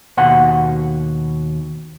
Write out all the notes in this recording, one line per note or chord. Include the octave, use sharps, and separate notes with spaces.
D#2 B2 F#5 C6